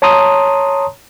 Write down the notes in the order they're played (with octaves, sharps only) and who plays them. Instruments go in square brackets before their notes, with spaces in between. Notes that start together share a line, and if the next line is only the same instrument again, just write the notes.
[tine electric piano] C#5 A5 A#5 C6 D#6